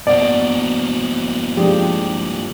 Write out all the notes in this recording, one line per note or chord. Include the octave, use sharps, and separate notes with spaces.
G2 B2 A#3 D5
F3 G#3 D4 F4 G4